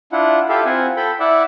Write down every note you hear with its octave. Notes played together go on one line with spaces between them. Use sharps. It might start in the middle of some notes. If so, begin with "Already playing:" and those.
D4 E4 F4 F#5
E4 F4 G4 A4 E5 F5
C4 F4 F#5 G#5
A4 G5 B5
E4 D5 E5 F#5